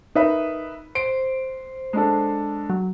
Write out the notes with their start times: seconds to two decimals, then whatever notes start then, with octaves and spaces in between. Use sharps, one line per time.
0.16 D#4 A#4 B4 E5
0.95 C5 D7
1.93 G#3 D4 A4
2.70 F#3